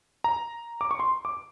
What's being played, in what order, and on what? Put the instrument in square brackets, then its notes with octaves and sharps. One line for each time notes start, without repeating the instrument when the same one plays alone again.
[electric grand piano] A#5
D6
C#6
C6
D6